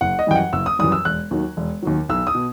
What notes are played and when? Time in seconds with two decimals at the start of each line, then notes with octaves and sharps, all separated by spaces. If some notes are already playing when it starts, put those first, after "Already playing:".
0.01 F#1 F#5
0.19 D#5
0.27 F#2 E3 G3 G5
0.36 F#5
0.53 F#1 E6
0.66 D#6
0.79 F#2 E3 G3 D#6
0.92 E6
1.05 E1 F#6
1.31 D#2 D#3 F#3
1.57 E1
1.82 D#2 D#3 F#3
2.09 B1 E6
2.27 D#6
2.34 B2